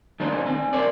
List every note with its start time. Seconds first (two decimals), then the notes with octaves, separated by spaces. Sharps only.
0.20 D#3 A3 C4 D4 G#4 C5
0.46 C4 G#5
0.73 A#4 C5 D5